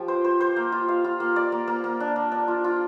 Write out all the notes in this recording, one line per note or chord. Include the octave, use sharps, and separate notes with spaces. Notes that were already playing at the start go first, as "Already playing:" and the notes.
Already playing: F3 G4
C5
C5
C5
A#3
F4
F5
F4
A#3
D5
A#3
A#3
A#3
D4
D4
D4
F4
F4